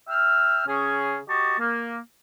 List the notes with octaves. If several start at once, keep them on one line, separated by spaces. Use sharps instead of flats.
E5 G5 F6
C#3 C#4 G#4
F#4 G4 D#5 A5 C#6
A#3